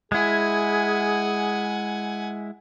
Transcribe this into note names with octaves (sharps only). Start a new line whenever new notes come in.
G#3 E4 G#4 F#5 G#5